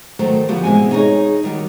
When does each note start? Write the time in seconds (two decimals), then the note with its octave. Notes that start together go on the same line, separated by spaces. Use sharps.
0.19 D#3 F#3 A3 C5
0.48 D3 F3 B3 F#4 G4
0.63 B2 E3 G#3 C4 G#5
0.92 D#4 G#4 C5 C#5 D#5
1.43 D#3 G3 F#4